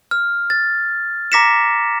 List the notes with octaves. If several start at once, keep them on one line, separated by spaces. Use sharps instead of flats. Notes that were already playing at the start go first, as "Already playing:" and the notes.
F6
A6
A#5 D6 A#6 B6 C#7 E7